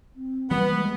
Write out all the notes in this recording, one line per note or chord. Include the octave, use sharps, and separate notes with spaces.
C4
E3 G3 A#3 B3 B4
G#3